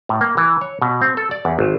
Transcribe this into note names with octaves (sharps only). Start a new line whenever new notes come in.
A2
A#3
E3
C#5
B2
C4
A4
D5
E2
G#1